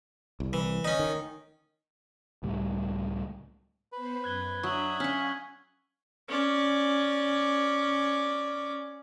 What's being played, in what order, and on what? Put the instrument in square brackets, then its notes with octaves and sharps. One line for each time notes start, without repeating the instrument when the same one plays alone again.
[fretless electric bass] C2
[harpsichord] E3
C#4 D#4
[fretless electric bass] D#3
[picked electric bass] C#2 A2 G3
[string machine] B3 C5 B5 [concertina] B4
[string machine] F#2 [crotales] F#6 G#6 G7
[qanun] F#3 [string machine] D4 B6 [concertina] E5 D#6 [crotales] C#6 F#7
[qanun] C#4 C#5 [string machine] F5 F#5 G#5 [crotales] F6 G#6 B6
[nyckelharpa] C#4 D5